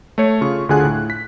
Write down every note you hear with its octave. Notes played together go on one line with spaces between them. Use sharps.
A3 C#5 C#7
C#3 F4 C#6
D2 D3 F4 G#4 G#5 F#6
A2
B6